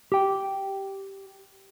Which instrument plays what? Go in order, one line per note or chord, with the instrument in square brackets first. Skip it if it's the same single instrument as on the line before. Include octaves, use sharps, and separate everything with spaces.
[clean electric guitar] G4 G5